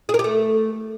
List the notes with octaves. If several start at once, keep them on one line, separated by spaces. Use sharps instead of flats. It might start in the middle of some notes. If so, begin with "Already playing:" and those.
G#4
A#4
G4
A3